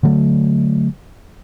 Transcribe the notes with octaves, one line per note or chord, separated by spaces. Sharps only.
D3 F#3 A3